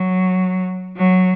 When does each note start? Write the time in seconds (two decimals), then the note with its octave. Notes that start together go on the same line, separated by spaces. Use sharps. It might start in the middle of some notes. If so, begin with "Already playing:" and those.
Already playing: F#3
0.97 F#3